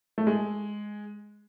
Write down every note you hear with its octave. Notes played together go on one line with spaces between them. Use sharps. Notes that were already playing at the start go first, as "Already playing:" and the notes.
A3
G#3